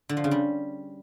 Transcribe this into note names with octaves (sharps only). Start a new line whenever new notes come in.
D3
F3
C#3
G3